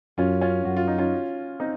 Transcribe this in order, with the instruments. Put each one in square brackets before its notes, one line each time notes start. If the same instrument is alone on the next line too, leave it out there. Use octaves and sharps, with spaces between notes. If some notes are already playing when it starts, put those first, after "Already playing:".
[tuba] F#2 [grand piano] C#4 F4
[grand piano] C#4 F4
[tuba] F#2 [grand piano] F#4
[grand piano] F4
D#4
C#4 F4
C4 D#4